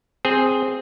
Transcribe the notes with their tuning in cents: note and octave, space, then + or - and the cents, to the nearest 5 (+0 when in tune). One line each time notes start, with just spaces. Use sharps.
C4 +0 G#4 +0